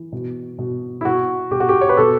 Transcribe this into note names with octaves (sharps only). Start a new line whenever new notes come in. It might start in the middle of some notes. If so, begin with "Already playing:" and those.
Already playing: E3
B2
B2
E4
B2 F#4
B2 G4
F#4
G4
C#5
B4
B2 A4